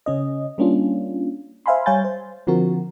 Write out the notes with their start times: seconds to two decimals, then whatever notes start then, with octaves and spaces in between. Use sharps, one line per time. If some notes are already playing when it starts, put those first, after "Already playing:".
0.06 C#3 C#4 D#5
0.58 G3 A#3 C#4 D4 F4
1.66 C5 E5 F5 G#5 B5 C6
1.86 G3 C#5 F5 G#5 G6 A6
2.05 C5
2.47 D3 F3 C4 F#4 A#4